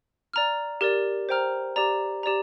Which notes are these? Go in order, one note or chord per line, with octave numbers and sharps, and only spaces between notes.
D5 A#5 F6
G4 A#4 D5
C5 G5 A#5 F6
G4 D5 A#5
G4 D5 A#5